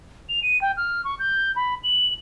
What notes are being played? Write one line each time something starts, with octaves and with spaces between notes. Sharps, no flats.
F7
D#7
G5
F6
C#6
G6
B5
F#7